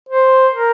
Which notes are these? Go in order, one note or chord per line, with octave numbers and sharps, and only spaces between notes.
C5
A#4